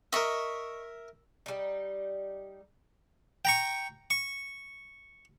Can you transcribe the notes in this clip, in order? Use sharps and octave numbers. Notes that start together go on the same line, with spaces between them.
A#4 D#5 E5 C#6
G3 D#4
G5 A#5 C#6
C#6